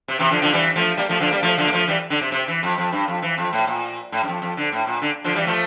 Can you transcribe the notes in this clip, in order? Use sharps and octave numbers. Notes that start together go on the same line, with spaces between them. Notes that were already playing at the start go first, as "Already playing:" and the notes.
C3
C3 E3
D3 F3
D3 F3
E3 G3
F3 A3
G3 A#3
F3 A3
D3 F3
G3 A#3
F3 A3
D3 F3
A#3
F3 A3
E3 G3
D3
C3
C3
E3
F2
F2
G2
F2
E3
F2
A2
A#2
A2
G2
F2
F2
D3
A2
A#2
D3
D3 F3
E3 G3
F3 A3